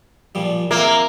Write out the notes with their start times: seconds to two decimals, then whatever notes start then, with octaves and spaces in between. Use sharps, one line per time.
0.35 A#2 F3 G3
0.71 A#3 C4 F4 E5